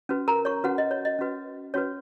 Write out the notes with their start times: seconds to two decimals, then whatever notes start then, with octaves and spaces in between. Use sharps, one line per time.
0.09 C#4 F#4 B4
0.28 A#4 A#5
0.45 C#5 C#6
0.64 C#4 F#4 B4 F#5
0.78 D#5
0.91 C#5
1.05 D#5
1.19 C#4 F#4 B4
1.74 C#4 F#4 B4 C#5